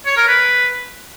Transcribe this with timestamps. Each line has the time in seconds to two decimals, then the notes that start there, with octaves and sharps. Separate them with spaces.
0.06 C#5
0.17 A#4
0.27 B4